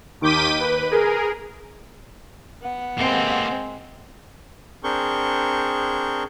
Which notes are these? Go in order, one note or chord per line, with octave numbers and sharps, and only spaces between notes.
D#2 D#3 D6 G6 B6 D#7
B4
G#4 A#4
B3 F#5
C3 G#3 A#3 C4
C4 D4 G#4 A#4 C#6 G6